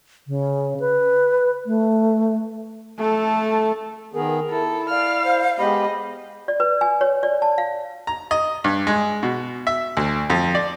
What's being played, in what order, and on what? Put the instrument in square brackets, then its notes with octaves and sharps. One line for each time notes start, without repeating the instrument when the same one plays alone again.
[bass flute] C#3
B4
A3
[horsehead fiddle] A3 A4
[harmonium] D#3 B3 G#4 [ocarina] A#4
[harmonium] E4 [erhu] A4
[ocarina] D5 [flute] F5 [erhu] F6
[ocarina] C5
[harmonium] G#3 B3 G4 [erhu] D#5 [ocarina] B5
[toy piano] D5
B4
G#5
C#5
D5
A5
F5
[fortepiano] A#5
D#5
G2
G#3
B2
E5
D2
F2
D5